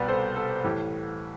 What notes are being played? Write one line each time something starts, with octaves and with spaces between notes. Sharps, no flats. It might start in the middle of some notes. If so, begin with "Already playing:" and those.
Already playing: C2 B2 G3 B4 D5
A4 C5
A4
A2 E3 G4